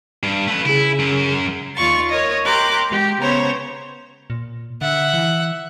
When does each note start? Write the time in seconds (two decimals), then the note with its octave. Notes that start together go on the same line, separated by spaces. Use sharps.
0.23 G2
0.48 A3 B4
0.66 C#3 E4 G#4
0.99 F#2
1.75 D#2 F4 D5 C#6 A6
2.09 A#4 C#5 D#5
2.44 G4 A#4 C6 D6 F#6
2.88 G#3 G4
3.20 C#3 B3 C5 C#5 A#5
4.30 A#2
4.81 D3 E5 F#5
5.14 E3